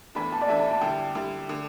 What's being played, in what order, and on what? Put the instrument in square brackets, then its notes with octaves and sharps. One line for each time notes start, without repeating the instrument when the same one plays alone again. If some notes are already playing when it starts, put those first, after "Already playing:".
[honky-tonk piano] E2 E3 A3 D4 [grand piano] B5
[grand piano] A5
D5
[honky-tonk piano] E2 E3 A3 D4 [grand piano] E5
[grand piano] A5
A5
[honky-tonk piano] D3 G3 E4 [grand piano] G5
[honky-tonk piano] D3 G3 E4
D3 A3